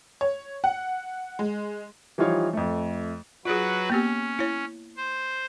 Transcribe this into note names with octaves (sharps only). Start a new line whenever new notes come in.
C#5
F#5
G#3
E3 F3 G3 D#4 F4 C#5
F2 A3
F#3 F4 F#4 G#4 B4
A#3 B3 C#4 G4
E4 C#5
C5